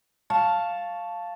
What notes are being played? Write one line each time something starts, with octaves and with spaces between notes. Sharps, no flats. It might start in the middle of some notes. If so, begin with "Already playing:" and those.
F5 A5 C#6